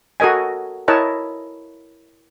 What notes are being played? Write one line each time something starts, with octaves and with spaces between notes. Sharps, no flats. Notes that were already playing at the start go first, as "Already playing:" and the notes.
F#4 A4 A#4 D#5 G#5
E4 A#4 C#5 D#5 A5